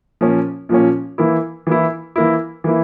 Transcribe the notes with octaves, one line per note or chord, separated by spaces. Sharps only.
A#2 F3 A#3 C#4
A#2 F3 A#3 C#4
E3 A#3 E4
E3 A#3 E4
E3 A#3 E4
E3 A#3 E4